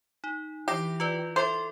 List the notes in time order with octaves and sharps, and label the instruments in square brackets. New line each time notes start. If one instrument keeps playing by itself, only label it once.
[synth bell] D#4
[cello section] E3 [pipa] G4 [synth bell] G6 A#6 C7
[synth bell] F4 B4 D5
[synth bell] A4 E5 C6 [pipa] C5